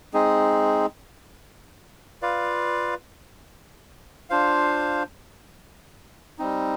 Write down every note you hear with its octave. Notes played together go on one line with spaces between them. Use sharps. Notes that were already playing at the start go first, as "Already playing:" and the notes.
G#3 C4 D#4 G#4
F4 B4 D5 F5
D4 F4 C5 F5
G3 C4 D#4